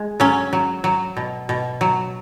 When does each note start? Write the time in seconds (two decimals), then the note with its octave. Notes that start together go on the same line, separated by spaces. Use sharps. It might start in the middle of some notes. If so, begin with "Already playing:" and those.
Already playing: G#3
0.20 F#3 C#4
0.53 F#3
0.84 F#3
1.17 B2
1.49 B2
1.81 F#3